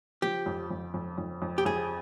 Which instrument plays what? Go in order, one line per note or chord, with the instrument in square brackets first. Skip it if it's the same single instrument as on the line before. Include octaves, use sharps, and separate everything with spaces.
[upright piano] F3 [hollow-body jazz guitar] G4
[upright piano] F2
F2
F2
F2
F2
[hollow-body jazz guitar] G4
[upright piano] F2 [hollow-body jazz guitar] G#4